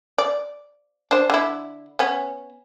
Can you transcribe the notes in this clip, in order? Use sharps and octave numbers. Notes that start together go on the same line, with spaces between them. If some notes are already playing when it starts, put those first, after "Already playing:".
D5
D4 C5
D3 E4
B3 C#4